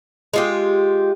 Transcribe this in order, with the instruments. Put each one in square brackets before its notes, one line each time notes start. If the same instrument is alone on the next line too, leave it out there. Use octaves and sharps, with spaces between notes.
[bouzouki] G#3 F4 G4